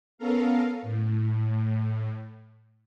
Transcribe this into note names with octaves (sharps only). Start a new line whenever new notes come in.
B3 C#4 A4 A#4 F5
A2